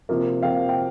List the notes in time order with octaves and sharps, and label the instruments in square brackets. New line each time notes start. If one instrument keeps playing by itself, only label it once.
[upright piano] C3 F3 A#3
C3 F3 A#3 F5 G5
G5